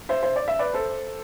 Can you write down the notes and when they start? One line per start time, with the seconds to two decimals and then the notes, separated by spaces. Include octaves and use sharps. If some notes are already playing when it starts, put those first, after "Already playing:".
0.09 C5 E5
0.23 C5 E5
0.36 D5
0.48 E5
0.59 B4 D5
0.74 A4 C5